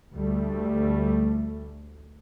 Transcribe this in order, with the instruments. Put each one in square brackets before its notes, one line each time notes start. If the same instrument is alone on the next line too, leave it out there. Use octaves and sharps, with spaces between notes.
[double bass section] D2 G3 A3